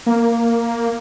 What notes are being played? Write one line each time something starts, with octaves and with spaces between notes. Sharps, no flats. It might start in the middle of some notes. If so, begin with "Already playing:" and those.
A#3